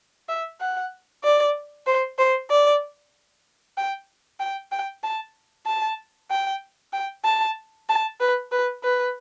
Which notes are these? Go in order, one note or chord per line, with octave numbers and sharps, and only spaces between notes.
E5
F#5
D5
C5
C5
D5
G5
G5
G5
A5
A5
G5
G5
A5
A5
B4
B4
B4